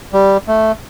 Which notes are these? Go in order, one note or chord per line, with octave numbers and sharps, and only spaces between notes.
G3
A3